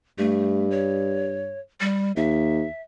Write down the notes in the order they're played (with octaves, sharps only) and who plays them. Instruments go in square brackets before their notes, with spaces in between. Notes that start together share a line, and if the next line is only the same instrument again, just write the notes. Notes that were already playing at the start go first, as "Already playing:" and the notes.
[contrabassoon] G2 [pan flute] A3
[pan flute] C#5
G3
[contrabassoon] D#2 [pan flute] E5